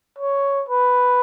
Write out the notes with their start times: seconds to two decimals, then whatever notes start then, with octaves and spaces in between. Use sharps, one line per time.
0.19 C#5
0.69 B4